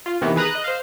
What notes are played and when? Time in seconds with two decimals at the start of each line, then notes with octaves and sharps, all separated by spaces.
0.06 F4
0.21 C3 D#3 E3 B3
0.36 G#4 B4 A#5 D#6 F#6
0.51 D#5 F#6
0.64 C5 F5